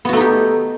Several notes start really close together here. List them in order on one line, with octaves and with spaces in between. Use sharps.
B3 F#4 A3 D#4 G4